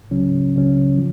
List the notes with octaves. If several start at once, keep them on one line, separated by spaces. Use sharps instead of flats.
C#2 C#3 F#3 C#4
C#2 C#3 F#3 C#4
F3